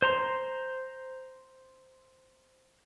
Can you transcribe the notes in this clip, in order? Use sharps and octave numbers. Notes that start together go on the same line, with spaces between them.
C5 A#5 C6